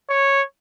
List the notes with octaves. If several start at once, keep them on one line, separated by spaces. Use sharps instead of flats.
C#5